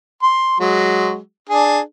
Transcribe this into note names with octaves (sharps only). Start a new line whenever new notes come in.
C6
F#3 G#3
D4 G#4